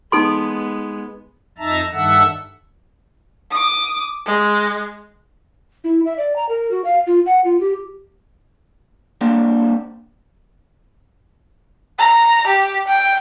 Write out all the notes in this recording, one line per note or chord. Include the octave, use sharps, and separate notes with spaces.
G#3 B3 D#4 A4 C6
F2 D#4 E5 A5 A#5
G2 D#3 A4 E5 F#5 E6
D6 D#6
G#3
E4
E5
D5
A#5
A#4
F#4
F5
F4
F#5
F4
G4
G3 A#3 C4 D4
A#5
G4
G5